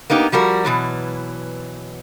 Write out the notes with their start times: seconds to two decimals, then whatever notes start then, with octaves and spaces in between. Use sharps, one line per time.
0.10 A#3 B3 D#4 G4
0.32 F3 G3 F#4 A#4
0.64 B2 E3 F#3